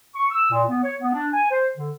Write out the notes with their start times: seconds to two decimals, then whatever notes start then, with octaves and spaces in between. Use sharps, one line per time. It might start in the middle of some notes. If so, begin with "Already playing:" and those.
0.15 C#6
0.31 E6
0.51 A#2
0.69 B3
0.83 C#5
1.01 B3
1.13 D4
1.33 G#5
1.51 C5
1.76 D3